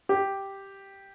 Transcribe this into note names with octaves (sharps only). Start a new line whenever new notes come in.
G4